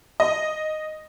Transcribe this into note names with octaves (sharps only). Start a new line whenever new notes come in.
D#5